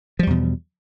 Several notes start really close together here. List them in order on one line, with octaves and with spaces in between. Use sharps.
F3 G3 E2 B2